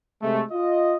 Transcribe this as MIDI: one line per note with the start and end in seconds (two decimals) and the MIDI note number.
0.21 0.42 48
0.21 0.42 56
0.21 0.42 57
0.51 0.95 65
0.51 0.95 75